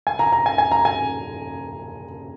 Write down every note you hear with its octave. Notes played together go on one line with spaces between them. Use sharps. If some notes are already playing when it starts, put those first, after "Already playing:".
G#5
A#5
A#5
G#5
G#5
A#5
G#5